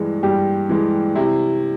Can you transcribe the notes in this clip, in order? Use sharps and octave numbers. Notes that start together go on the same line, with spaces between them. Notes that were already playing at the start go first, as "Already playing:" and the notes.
Already playing: G2 E3 G#3
G2 G4
E3 G#3
C3 E4